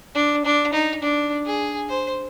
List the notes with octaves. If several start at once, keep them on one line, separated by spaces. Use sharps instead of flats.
D4
D4
D#4
D4
G#4
C5